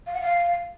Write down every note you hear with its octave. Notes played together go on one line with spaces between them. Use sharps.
F5
F#5
F5